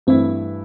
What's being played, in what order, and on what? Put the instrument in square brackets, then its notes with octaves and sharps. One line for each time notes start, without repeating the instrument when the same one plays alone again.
[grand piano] G2 E3 A3 E4 [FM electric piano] C4